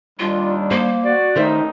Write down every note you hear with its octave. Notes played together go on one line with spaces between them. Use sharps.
D#2 G3 D4 F4
A#3 C5
F#4 D5
A1 D#3 A3 D#4 C5 E5